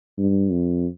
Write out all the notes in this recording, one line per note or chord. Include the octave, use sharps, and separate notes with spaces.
G2
F2